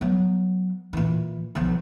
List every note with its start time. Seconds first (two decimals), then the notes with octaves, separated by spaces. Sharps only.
0.01 F#3 B3
0.93 A#2 E3
1.55 B1 F3